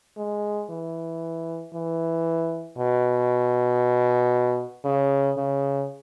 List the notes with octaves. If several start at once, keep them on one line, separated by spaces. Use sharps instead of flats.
G#3
E3
E3
B2
C#3
C#3